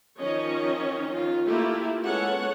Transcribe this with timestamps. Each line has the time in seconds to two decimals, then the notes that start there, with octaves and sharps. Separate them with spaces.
0.18 D#3 F3 C#4 C#5 D#5
1.12 D#3 F4
1.47 A3 A#3 E4 F4 G4
2.02 G#3 B3 C#4 A4 C#5 F#5